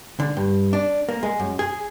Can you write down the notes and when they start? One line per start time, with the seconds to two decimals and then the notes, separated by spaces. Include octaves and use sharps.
0.20 D3
0.37 G2
0.73 D4
1.09 A#3
1.23 G#3
1.40 F#2
1.59 G#4